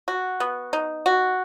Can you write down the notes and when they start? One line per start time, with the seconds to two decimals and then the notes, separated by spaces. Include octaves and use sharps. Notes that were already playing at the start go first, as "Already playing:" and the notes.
0.08 F#4
0.40 B3
0.73 D#4
1.06 F#4